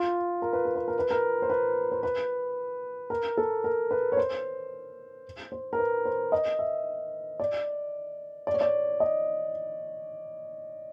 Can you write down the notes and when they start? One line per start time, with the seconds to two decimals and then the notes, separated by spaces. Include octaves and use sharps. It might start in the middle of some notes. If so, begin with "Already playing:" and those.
Already playing: F4
0.42 A#4
0.53 B4
0.65 A#4
0.76 B4
0.88 A#4
0.99 B4
1.11 A#4
1.42 C5
1.50 B4
1.92 C5
2.03 B4
3.10 A#4
3.37 A4
3.64 A#4
3.91 B4
4.12 C#5
4.17 C5
5.52 C5
5.73 A#4
5.78 B4
6.05 C5
6.32 D#5
6.59 E5
7.40 D5
8.47 D5
8.54 C#5
8.61 D5
9.00 D#5